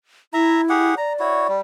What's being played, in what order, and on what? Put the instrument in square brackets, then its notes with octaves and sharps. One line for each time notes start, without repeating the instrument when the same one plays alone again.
[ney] E4 [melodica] E5 A#5
[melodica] G4 G#4 F#5
[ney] D5 [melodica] A#5
[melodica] E4 F#4 C#5
G3